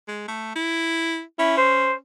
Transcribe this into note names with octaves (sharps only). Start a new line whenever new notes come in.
G#3
A3
E4
C#4 E4
C5